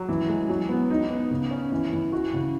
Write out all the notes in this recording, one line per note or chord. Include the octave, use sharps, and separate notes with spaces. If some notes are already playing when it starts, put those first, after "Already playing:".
Already playing: F#3
E3
G#3
F#3
B3
D#4
B3
C#3
C#4
E3
E3
F#4
C#3